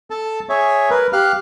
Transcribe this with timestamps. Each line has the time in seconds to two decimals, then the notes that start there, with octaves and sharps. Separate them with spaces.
0.10 A4 A5
0.49 G#4 C#5 E5
0.90 A#4 B4
1.13 G4 F5 F6 F#6